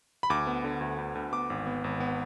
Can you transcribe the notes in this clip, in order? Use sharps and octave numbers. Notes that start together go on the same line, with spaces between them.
B5
D2 D6
B3
D3
D2
D2
D2
B3 D6
G#1
B3
G#1
B3